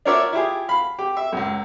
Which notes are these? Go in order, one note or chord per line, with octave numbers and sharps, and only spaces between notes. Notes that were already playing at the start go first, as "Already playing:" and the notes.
D4 F4 A#4 C#5 D5 E5
E4 F4 G4 G#4
F5 B5
G4
E5
C#2 F#2